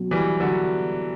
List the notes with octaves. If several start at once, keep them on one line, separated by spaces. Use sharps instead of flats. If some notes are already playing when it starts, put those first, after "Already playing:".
Already playing: B2 F#3 C#4 F#4
E3 G3
D3 F#3